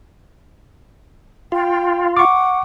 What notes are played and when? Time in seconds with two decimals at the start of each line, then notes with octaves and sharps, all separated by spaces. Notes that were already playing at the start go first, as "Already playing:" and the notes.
1.52 F4 G5
2.17 F#5 C#6 D6